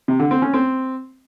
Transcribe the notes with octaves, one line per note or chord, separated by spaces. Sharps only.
C3
D3
C4
C#4
C4